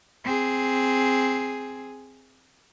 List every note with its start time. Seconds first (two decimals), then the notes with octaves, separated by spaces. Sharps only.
0.24 C4 G#4